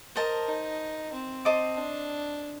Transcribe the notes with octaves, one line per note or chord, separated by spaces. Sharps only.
A#4 C5 D#5 A5
D#4
C4
C5 D#5 A5 D6
D4